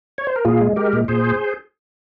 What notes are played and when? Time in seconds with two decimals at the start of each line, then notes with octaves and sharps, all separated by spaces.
0.18 C#5
0.27 C5
0.36 A#4
0.45 A#2 F4 G#4
0.61 G#3
0.76 G#3 G4 A#4
0.93 A#2
1.08 A#2 G#4 C5